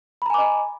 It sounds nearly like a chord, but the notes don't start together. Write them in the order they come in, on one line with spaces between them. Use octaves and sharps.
B5 A#5 G#5 D6 D#5